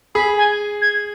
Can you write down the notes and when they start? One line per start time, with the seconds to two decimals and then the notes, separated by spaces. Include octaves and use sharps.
0.15 G#4 B5
0.38 G#5
0.82 G#6